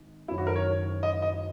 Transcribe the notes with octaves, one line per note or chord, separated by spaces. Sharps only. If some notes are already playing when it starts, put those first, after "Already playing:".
Already playing: G#1
F#1 F#2 D#3 F#3 C#4 E4
F#4
A#4
C#5
D#5
D#5